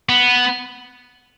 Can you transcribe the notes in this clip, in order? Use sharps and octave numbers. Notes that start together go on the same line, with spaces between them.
B3